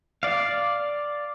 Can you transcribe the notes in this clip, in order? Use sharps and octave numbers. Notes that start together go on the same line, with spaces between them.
D5 F5